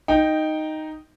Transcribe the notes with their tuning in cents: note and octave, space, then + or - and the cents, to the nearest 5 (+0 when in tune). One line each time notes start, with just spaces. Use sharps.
D#4 +0 G5 +0